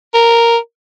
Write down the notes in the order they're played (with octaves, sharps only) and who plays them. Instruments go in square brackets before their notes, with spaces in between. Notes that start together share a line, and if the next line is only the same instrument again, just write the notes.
[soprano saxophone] A#4